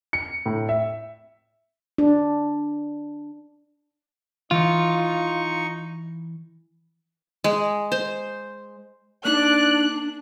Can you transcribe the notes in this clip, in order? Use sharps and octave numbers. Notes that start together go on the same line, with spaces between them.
C#7
A2
E5
D4
E3 D#4 F4 C#6
G#3
C5
A#3 D4 D#4 D5 F#6